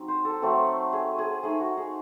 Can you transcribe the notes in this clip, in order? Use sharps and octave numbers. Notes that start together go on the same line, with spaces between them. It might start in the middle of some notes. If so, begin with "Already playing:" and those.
Already playing: F#3 C4 D#4
C5
A4
F#3 A3 C4 A4
G#4
G#4
A3 D#4 G#4
F#4
G#4